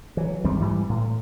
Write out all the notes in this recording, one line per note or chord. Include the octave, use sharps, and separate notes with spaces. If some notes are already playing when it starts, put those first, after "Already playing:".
E3 F#3
F#2 D#3 G3 C4
G#2 E3 G3 A3
A2